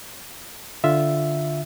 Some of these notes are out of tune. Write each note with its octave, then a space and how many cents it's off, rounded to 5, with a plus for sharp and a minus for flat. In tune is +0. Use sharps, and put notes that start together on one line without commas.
D3 +0 F4 +0 E5 +0